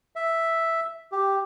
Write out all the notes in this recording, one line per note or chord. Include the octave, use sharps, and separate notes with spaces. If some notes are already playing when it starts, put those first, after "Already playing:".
E5
G4